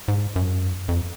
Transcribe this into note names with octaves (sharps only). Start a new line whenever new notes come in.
G#2
F#2
F2